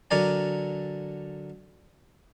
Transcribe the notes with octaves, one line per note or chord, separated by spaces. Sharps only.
D3 F#3 A#4 D5 G#5